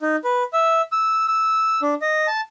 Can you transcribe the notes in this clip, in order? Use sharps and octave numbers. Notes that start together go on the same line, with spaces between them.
D#4
B4
E5
E6
E6
D4
D#5
A5